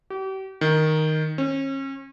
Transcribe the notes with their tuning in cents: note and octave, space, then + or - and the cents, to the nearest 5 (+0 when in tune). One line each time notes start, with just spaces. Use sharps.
G4 -40
D#3 +0
C#4 -35